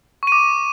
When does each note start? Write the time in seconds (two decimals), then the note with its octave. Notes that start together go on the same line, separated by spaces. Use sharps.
0.23 C#6
0.27 D#7
0.32 D6